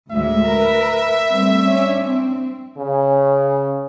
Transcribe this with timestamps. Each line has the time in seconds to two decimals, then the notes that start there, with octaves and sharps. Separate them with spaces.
0.11 D2 A2 G#3 E5
0.48 A#4 B4
1.30 G3 A3 C4
1.65 C#4 D4
2.02 C4
2.77 C#3